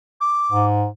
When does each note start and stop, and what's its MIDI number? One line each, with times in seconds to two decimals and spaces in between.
0.21 0.66 86
0.52 0.87 44